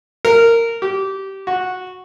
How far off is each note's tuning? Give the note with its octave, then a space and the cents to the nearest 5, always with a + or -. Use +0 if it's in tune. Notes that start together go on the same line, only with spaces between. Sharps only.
A#4 -15
G4 -20
F#4 -10